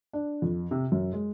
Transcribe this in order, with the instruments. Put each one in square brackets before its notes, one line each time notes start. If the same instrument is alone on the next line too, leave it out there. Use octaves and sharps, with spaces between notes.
[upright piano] D4
F2
C3
F#2
G#3